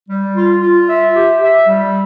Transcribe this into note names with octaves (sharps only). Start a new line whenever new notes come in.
G3
F4
F4
E5
G4
E5
G3